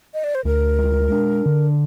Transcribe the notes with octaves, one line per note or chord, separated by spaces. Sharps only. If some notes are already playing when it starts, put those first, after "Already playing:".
D#5
D5
C5
D2 A#4
G#3
D4
D3